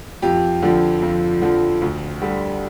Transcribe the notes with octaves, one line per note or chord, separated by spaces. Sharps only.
F2 G4
D3 F3
F2
D3 F3
D2
D3 G3